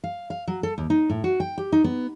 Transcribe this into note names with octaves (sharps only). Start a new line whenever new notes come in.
F5
F5
F#3
A4
D#2
D#4
A2
F#4
G5
G4
D#4
B3